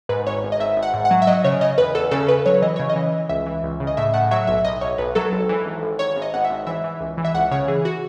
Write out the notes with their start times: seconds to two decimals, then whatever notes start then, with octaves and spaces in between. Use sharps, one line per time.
0.09 G#2 B4
0.27 G#1 C#5
0.43 G#1
0.52 D#5
0.60 G#1 E5
0.77 G#1
0.82 F#5
0.94 G#2
1.05 F#5
1.11 F#3
1.22 E5
1.27 F#3 D#5
1.44 C#3 C#5
1.61 C#3 D#5
1.78 E2 B4
1.95 E2 A4
2.11 C#3 A4
2.28 C#3 B4
2.46 F#3 C#5
2.62 E3 D#5
2.76 C#3 C#5
2.89 D#5
2.96 E3
3.13 E3
3.29 C#2 E5
3.46 E3
3.63 C#2
3.80 C#3
3.87 D#5
3.97 A2 E5
4.14 A2 F#5
4.31 F#3 E5
4.47 B1 E5
4.64 B1 D#5
4.81 B1 C#5
4.98 B1 B4
5.15 F#3 A4
5.32 G#1
5.49 E3
5.66 G#1
5.83 G#1
5.99 G#1 C#5
6.16 G#1
6.22 D#5
6.34 G#1 F#5
6.44 E5
6.50 G#1
6.67 E3 E5
6.84 E3
7.00 C#2
7.17 E3
7.25 E5
7.34 C#2 F#5
7.51 C#3 C#5
7.68 E3 G#4
7.85 F#4